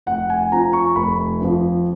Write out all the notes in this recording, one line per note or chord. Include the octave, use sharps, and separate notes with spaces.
F1 F#5
G#5
F2 F3 A#5
C#6
F1 B5
F2 F3